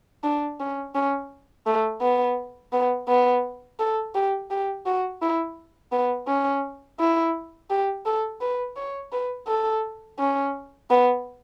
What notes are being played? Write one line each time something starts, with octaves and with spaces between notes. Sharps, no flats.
D4
C#4
C#4
A3
B3
B3
B3
A4
G4
G4
F#4
E4
B3
C#4
E4
G4
A4
B4
C#5
B4
A4
C#4
B3